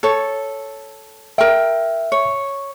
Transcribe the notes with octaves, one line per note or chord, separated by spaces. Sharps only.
A4 C#5
A#4 E5 G5
C#5